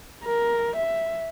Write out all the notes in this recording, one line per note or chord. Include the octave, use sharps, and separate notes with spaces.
A#4
E5